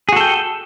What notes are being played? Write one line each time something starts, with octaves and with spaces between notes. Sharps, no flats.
F#4 G#4 A4 G5